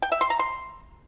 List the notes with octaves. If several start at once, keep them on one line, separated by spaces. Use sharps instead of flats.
G5
E5
C6
A#5
C6